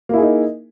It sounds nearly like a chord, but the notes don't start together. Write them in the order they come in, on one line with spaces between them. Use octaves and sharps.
A#3 E4 G#4 D#4